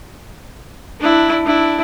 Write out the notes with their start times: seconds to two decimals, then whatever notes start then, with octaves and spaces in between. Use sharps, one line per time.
1.00 D4 E4
1.44 D4 E4